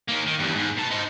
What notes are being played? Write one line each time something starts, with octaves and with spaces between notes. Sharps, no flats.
D#3 A#3
D#3
E2 G2
G#2
B2 A5
D#4 C5